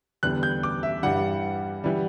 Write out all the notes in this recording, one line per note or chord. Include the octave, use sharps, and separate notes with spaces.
E2 D3 G3 F#6
G6
D6
E5
G2 E3 G3 F#5
E3 G3